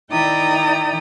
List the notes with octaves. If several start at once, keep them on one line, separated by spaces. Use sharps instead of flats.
D#3 E4 D5 G5 A#5 D#6